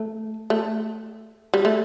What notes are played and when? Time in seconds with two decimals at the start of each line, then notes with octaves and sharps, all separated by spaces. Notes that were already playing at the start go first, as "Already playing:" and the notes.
Already playing: A3
0.50 A3
1.54 G3
1.65 A3